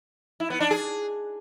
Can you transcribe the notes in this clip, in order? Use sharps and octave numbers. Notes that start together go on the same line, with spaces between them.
E4
B3
D4
G#4